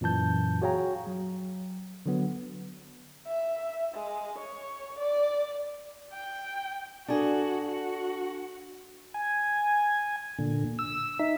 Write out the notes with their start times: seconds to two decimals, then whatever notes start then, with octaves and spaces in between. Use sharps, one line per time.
0.01 F#2 A#2 E3 A5 G6
0.62 F#4 G#4 C#5 F5 G5 A#5
1.07 F#3
2.06 D3 F#3 B3
3.27 E5
3.94 G#3
4.38 C#5
4.98 D5
6.13 G5
7.08 D4 F#4 G#4 A4
7.66 F#4
9.14 G#5
10.39 A#2 D3
10.79 E6
11.19 D#4 E5